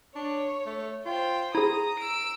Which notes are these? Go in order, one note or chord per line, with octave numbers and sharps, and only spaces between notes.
D4 C#5
A3
F4 C5 G5
E4 G#4 A#5 D#6
E6 D7